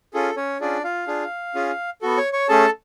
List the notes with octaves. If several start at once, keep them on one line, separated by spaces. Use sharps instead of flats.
C#4 F4 G#4 A4
C#4 C#5
C#4 D4 F4 G#4 D5
F4 F5
D4 F4 G#4
C#4 F4 G#4
B3 F#4 A4
C#5 C#6
C#5 C#6
A3 C#4 G#4 A4 A5